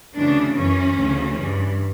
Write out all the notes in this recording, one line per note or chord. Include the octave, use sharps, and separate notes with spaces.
D2 C#3 E3 D4
F#2 E3 C#4
D2 C#3 E3
G2 E3